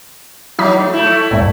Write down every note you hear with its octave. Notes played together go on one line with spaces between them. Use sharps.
F#3 D#4 E4 B5
A3
A3 E4
C#6
B1 E2 G2